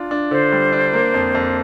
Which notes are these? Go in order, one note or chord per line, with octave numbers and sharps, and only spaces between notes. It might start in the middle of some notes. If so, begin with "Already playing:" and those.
Already playing: D4 F4
D4
D3 C5
G3
D4
A#3
F2
F2